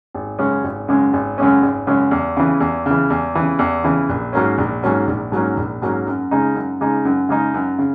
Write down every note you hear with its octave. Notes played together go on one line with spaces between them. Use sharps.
G#1
F#2 C#3 G#3 C#4
G#1
F#2 C#3 G#3 C#4
G#1
F#2 C#3 G#3 C#4
G#1
F#2 C#3 G#3 C#4
E2
C#3 E3
E2
C#3 E3
E2
C#3 E3
E2
C#3 E3
A#1
G#2 F#3 A#3 C#4
A#1
G#2 F#3 A#3 C#4
A#1
G#2 F#3 A#3 C#4
A#1
G#2 F#3 A#3 C#4
F#2
C#3 G#3 D#4
F#2
C#3 G#3 D#4
F#2
C#3 G#3 D#4
F#2
C#3